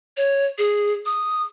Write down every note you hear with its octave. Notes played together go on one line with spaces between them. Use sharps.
C#5
G#4
D#6